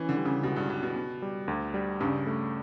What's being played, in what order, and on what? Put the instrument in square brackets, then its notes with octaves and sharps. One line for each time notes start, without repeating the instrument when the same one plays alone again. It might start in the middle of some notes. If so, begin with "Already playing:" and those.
Already playing: [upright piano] E3 [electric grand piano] C#4
[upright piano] D3
[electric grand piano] G3
[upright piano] C#3
[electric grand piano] C#2 [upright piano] B2
[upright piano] G2
[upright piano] G2 [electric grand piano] G3
[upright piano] B2
[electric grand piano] B3
G3
D2
G3
[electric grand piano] G2 [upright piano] C#3
[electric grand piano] A3